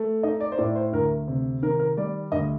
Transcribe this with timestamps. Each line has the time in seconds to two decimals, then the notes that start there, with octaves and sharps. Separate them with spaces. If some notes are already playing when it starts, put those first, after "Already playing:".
Already playing: A3
0.23 D#4 D#5
0.40 D5
0.52 C5
0.58 A2 D5
0.75 C5
0.93 D2 A#4
1.28 C3
1.63 D#3 A#4
1.79 A#4
1.97 G3 D5
2.32 D2 D#5